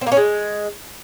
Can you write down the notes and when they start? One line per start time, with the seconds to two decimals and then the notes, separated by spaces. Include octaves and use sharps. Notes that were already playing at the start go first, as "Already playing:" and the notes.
0.01 C4
0.07 A#3
0.12 C#4
0.17 G#3